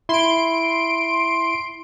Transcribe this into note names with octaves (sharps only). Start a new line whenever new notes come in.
E4 C6 D7